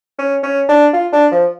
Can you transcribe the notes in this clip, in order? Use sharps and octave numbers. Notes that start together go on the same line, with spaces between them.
C#4
C#4
D4
F4
D4
F3